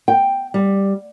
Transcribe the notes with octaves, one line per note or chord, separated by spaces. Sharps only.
G5
G3